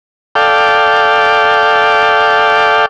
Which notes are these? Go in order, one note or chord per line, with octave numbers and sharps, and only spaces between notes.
A4 D5 F5 G5